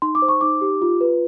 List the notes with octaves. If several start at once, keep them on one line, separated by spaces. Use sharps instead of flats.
D#4 C6
D6
C5
C#6
D#4 D6
G4
F4
B4